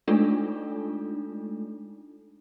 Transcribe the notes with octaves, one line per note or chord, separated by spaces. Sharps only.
G#3 A3 D4 D#4 F4 A4